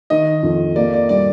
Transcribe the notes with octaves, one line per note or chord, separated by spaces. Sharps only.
D#3 D#5
F2
A#3 D5
D5
G3 D5